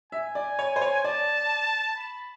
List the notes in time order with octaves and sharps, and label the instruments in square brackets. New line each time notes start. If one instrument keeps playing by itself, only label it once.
[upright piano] E5 [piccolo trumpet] G#5
[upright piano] D5
C#5
C5
C#5
[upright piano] D5 [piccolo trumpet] A5
[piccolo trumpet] B5